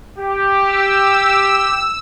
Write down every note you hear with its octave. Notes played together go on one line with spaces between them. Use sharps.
G4
E6